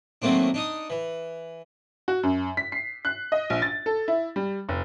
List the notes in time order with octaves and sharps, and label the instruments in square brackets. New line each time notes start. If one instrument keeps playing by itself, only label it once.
[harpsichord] D#3 F#3 A3 A#3 C4 D4
D4 D#4 D#6
E3
[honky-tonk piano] F#4
F#2
B6
C7
F#6
D#5
A#1
A6
A4
E4
G3
F1